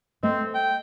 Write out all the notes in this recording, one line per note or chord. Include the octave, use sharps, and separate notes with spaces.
A3 C4 D#5
G5